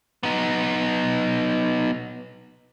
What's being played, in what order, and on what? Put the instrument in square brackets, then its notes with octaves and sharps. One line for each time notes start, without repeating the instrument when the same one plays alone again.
[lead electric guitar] B3 D#4